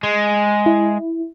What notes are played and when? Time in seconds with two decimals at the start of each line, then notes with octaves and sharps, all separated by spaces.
0.03 G#3
0.66 E4